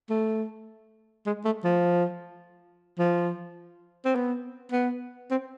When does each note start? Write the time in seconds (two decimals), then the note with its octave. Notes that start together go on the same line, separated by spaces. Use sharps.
0.10 A3
1.26 G#3
1.45 A3
1.64 F3
2.99 F3
4.05 C4
4.15 B3
4.72 B3
5.31 C4